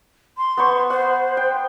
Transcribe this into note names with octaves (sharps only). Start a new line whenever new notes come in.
C6
B3 C5 C#6
C5 F#5
G5